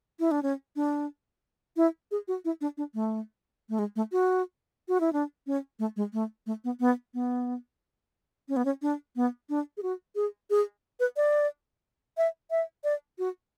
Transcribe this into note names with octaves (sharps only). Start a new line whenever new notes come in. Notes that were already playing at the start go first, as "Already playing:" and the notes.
E4
D4
C#4
D4
E4
G#4
F#4
E4
D4
D4
A3
A3
G#3
A3
F#4
F#4
E4
D4
C#4
A3
G#3
A3
A3
B3
B3
B3
C#4
B3
C#4
D4
B3
D4
G#4
F#4
G#4
G#4
B4
D5
E5
E5
D5
F#4